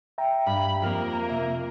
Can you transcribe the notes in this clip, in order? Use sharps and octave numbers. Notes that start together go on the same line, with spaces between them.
E5 G5 A#5
G2 B5
F2 A#3 A#4 F6 D#7
C3 E5